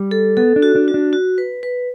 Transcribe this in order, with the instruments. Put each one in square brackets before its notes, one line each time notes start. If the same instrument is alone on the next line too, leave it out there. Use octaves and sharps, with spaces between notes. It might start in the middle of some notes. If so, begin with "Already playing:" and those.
Already playing: [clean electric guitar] G3
[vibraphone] A4
[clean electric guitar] B3 [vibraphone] A4
[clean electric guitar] D4
[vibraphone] F#4
[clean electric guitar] D4
[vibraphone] F#4
[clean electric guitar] D4
[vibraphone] F#4
B4
B4